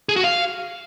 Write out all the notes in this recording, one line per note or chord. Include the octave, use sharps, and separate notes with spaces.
G#4
F#4
F5